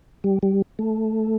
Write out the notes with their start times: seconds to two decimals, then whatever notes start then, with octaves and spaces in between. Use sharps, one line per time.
0.24 G3
0.43 G3
0.79 A3